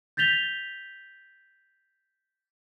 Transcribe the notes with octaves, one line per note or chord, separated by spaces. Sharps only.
G6 A6 B6 F7 G7